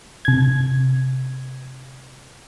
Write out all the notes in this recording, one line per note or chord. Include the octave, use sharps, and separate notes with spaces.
C3 G#6